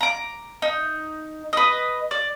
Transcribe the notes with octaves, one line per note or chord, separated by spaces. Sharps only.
A#5 D6
D#4
B4 D#5
D5